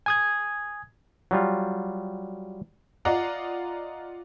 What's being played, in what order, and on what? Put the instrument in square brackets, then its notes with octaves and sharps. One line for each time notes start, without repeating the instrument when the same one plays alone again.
[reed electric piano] G#5 D#6 G#6
[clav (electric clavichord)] F#3 G3 F4
[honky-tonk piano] F4 D5 D#5 F#5 A#5